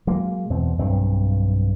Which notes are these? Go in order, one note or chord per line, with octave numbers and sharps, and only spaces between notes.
F#3 G#3 A#3
E2 B2 C4
B1 G2 C4